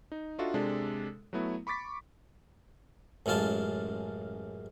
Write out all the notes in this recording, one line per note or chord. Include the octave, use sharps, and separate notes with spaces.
D#4
D4 D#4 F4 F#4 A4 E5
C3 G#3 D4 A4
F#3 A3 B3 E4
B5 C#6 D6 A6 B6
A1 F#2 G#3 F4 A5